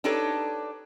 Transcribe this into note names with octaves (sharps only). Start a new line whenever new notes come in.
D4 D#4 G4 A4 B4 C#5